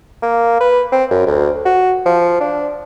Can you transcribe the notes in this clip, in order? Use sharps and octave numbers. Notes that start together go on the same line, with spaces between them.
A#3
B4
C4
F#2
D2
F#4
F3
D4